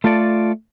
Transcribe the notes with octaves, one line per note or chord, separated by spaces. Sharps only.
A3 F4 A4 D5